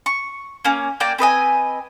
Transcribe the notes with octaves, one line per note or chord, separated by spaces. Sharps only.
C#6
A#3 C#4
A#3 D5 G5
C4 B4 D#5 G#5